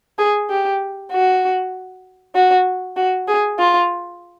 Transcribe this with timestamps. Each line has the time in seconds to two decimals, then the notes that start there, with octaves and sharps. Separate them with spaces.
0.19 G#4
0.50 G4
1.12 F#4
2.35 F#4
2.96 F#4
3.28 G#4
3.58 F4